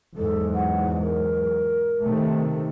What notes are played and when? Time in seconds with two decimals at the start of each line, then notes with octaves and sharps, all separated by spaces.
0.17 E2 G#2 F#3 A4
0.54 F#5
1.01 A#4
2.04 C3 D#3 A3